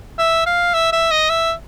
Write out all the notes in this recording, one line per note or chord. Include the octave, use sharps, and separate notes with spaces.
E5
F5
E5
E5
D#5
E5